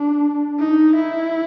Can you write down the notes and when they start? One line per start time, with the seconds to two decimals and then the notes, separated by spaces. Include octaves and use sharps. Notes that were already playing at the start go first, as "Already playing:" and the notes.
Already playing: D4
0.60 D#4
0.96 E4